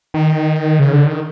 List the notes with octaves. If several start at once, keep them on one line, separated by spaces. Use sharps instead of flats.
D#3
C#3
D3
D#3